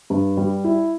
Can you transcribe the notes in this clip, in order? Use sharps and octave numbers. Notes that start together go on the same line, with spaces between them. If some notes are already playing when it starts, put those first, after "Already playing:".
G2
G3
E4